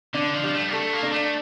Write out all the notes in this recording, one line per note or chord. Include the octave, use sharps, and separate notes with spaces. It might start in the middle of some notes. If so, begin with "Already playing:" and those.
D3 D4
F3
G3
A3
A#3
A3 A4
A#3
D4
A3